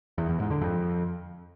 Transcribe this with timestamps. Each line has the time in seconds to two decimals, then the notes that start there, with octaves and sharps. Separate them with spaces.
0.18 E2
0.29 E2
0.40 G#2
0.51 D3
0.61 F2